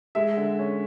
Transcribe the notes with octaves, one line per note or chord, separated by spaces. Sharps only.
G#3 E5
D3
C#4